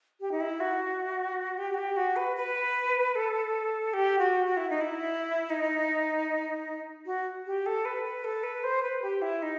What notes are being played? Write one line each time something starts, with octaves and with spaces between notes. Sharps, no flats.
G4
D#4
E4
F#4
G4
F#4
G4
F#4
B4
B4
A4
G4
F#4
F#4
E4
D#4
E4
D#4
F#4
G4
A4
B4
B4
A4
B4
C5
B4
G4
E4
D#4